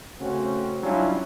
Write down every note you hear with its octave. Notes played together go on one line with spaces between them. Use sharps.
C#3 A3 C4 C#4 F#4
F#3 G3 C#4 D4 E4 F4